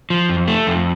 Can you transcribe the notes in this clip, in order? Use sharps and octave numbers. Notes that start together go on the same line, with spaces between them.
F3
F2
A3
F2